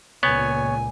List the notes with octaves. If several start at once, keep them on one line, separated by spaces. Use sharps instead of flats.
C#2 A#2 B3 C#5 G#5